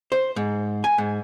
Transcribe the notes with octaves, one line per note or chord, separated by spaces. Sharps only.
C5
G#2
G#5
G#2